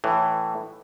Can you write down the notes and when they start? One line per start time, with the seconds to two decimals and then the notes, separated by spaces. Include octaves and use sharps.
0.04 A2 E3